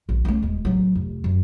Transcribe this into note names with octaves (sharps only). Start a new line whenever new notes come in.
A#1
A3 C#4
D#1 G#3
A1 F#3
F1
F#2